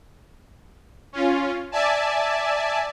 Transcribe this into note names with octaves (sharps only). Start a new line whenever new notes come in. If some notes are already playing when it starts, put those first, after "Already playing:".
C#4 F4
D5 E5 G#5 A5